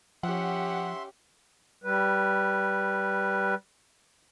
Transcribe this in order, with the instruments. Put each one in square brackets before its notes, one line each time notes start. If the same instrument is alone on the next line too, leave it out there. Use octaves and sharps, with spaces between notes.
[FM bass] F3 [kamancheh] C#4 G4 [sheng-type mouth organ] E5 C6 [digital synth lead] F#5
[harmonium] G3 B4